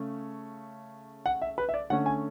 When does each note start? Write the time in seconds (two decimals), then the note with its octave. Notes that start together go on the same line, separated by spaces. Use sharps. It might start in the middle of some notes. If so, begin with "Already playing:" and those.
Already playing: C#3 A3 C#4
1.26 F#5
1.42 E5
1.58 B4
1.69 E5
1.74 D5
1.90 D3 A3 C#4 F#5
2.06 G#5